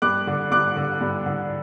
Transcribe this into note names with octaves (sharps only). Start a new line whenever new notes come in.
G2 D6 F#6
D3
G2 D6 F#6
D3
G2
D3